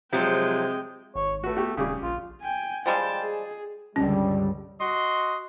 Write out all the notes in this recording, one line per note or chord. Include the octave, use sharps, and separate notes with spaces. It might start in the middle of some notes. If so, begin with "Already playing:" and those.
C3 F3 F#3 G#3 G5
G#1 C#5
A3 F#4 B4
B3 F#4 G4
D#1 C#3 G3 G#4 D6
A#1 F4
G5 G#5
F3 G3 G#3 G5 A5
G#4
C#2 G2 D3 G3 C#4
F#4 D#5 C6